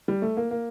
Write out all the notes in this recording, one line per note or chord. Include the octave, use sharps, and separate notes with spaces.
G3
A3
A#3
A#3